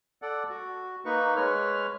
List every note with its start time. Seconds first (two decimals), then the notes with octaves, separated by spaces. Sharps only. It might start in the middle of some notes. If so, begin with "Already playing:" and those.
0.22 A4 D5 F#5
0.50 F#4
1.05 A#3 D#4 B4 C#6
1.36 G#3 B4 C#5 F6